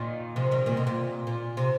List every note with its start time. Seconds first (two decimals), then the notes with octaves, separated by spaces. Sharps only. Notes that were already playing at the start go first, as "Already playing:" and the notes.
Already playing: A#2 D#3
0.36 C3 F3
0.51 D#3 G3
0.66 A#2 D#3
0.77 C3
0.87 A#2
1.27 A#2
1.57 C3